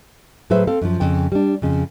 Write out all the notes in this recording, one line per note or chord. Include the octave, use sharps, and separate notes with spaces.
A2 F#3 G#4 B4 C5 E5
C4 A4 F5
F#2 F3
F2 C#3 G5
G3 D4
F2 C#3